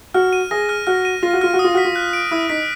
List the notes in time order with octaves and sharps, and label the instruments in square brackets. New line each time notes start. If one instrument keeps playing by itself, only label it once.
[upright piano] F#4 [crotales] F6
[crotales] D#7
[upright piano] G#4 [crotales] A#6
[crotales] F6
[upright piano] F#4 [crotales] F6
[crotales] D#7
[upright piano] F4 [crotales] A#6
[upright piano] F#4
[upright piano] F4 [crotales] F6
[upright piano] F#4
[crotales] D#6
[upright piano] F4
[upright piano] F#4 [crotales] B6
[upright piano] F4
[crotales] F#6
D7
[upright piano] E4 [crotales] D#6
[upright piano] D#4 [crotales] B6